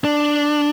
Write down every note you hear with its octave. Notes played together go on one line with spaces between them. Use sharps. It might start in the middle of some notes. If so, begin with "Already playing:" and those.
D4